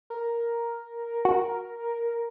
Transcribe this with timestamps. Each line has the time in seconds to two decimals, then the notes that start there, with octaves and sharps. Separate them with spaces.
0.10 A#4
1.25 F#4